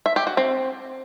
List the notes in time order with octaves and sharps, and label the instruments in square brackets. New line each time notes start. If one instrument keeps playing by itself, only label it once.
[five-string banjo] E5
G4
F#4
C4